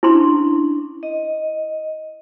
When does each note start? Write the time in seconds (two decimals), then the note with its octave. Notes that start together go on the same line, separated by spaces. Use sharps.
0.03 C#4 D4 E4 C6
1.03 D#5